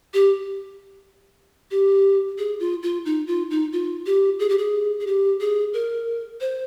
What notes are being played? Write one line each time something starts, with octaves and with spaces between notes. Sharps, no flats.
G4
G4
G#4
F4
F4
D#4
F4
D#4
F4
G4
G#4
G4
G#4
G#4
G4
G#4
A#4
C5